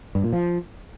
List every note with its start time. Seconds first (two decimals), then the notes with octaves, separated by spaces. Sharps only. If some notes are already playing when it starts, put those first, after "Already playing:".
0.15 G2
0.24 A#2
0.33 F3